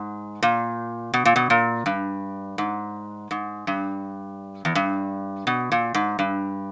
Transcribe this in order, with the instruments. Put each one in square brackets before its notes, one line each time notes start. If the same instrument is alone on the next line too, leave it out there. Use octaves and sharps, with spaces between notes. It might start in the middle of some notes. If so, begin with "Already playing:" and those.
Already playing: [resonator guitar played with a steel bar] G#2
A#2
B2
A#2
B2
A#2
G2
G#2
G#2
G2
E2
G2
B2
A#2
G#2
G2